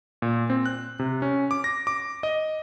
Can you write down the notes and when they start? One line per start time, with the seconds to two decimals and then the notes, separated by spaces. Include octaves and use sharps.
0.22 A#2
0.50 C4
0.66 F#6
0.99 C3
1.22 C#4
1.51 D6
1.64 A#6
1.87 D6
2.23 D#5